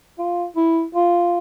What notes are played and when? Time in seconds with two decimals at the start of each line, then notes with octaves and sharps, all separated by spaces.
0.19 F4
0.56 E4
0.95 F4